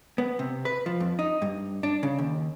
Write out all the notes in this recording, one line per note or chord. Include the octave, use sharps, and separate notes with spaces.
B3
C3
B4
F3
F2
D#4
G2
D4
C#3
D#2